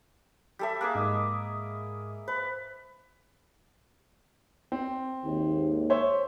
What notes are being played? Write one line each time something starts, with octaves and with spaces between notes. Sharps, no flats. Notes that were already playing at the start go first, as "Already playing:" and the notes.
G3 A4 E5
A#3 G#4 D6 F#6
G#2 D#5 D#6
B4 C5
C4
G#1 D#2
C5 C#5 E5